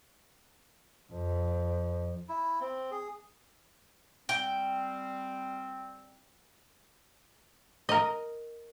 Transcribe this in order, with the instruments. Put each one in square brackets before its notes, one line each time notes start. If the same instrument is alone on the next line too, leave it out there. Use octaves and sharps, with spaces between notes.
[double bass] F2
[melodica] E4
C4
G#4
[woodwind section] G3 C4 [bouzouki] G5
[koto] A#4 D#5